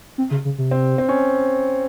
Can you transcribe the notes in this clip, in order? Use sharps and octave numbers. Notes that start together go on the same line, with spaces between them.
C4
C#3
C#3
C3
C4
C4
C#4